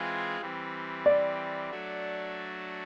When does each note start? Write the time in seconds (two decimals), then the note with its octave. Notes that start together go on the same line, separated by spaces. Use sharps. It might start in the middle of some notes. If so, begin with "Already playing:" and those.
Already playing: E3 G#3 C4 F4 G#4
0.41 E3 G3 C4
1.06 D5
1.70 F#3 A3 D4 F#4